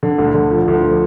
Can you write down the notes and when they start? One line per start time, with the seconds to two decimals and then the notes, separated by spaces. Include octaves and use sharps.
0.03 D3
0.18 D2
0.34 D3
0.51 F3
0.68 D2
0.83 F3